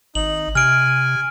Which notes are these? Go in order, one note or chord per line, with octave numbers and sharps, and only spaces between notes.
G#1 D#4 F#7
C3 G#5 F6 D7